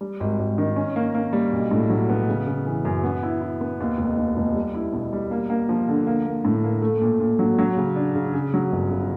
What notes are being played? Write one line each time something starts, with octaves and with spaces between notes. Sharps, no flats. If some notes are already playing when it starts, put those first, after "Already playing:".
G3
G#1
G#1
D#3
C#4
A#3
A#3
G3
B1
A2
F#3
B3
C#3
C#3
E3
F#2
B3
E4
E4
B3
D#2
F1
D#2
F1
G3
E4
B2
G3
A#3
A#3
F3
D3
A#3
A#3
A2
A#3
A3
A#2
A#2
F#3
F#3
C#3
D4
C#3
C#3
F#3
G1
C#3